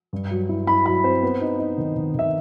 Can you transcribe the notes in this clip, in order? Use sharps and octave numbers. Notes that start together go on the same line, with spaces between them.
G2
F#3
E4
E4 B5
F#3 B5
C4 C5
B3
D#4
D#4
D#3
D#3
D#3 E5